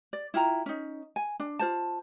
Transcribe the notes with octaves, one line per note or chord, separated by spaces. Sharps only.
D5
E4 F4 G5 A#5
C#4 D#4
G#5
D4
F4 C5 A5